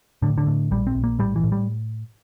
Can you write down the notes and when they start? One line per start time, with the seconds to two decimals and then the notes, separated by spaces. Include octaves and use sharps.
0.22 A2 D3
0.38 D3
0.47 A2
0.71 A#1 G3
0.87 C4
0.95 A#1
1.04 A#3
1.19 A2 G3
1.36 E3
1.44 A2
1.52 G3